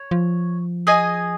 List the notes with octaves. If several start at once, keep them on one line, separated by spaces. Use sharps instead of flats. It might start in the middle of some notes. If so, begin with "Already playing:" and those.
Already playing: C#5
F3
G#4 D#5 G#5